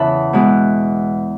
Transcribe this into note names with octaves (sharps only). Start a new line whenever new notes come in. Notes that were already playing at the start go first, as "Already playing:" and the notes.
Already playing: E2 C#3 E3 B3 A5 B5
B2 G#3 B3